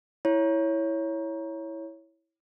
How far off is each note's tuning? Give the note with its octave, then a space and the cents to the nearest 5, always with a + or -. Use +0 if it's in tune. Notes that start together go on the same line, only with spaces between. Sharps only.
E4 -5 C#5 +0